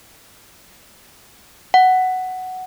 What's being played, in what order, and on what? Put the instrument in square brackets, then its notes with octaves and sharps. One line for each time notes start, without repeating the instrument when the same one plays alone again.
[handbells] F#5